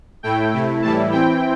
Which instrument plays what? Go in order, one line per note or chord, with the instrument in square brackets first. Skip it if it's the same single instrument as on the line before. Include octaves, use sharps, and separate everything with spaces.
[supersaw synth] A2 A3 E4 G5
C3 A3 E4
A2 E3 G3 E4 A5
E3 C4 E4 G5